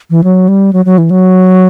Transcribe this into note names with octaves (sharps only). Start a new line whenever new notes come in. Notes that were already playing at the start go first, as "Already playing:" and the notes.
E3
F#3
G3
F#3
F#3
E3
F#3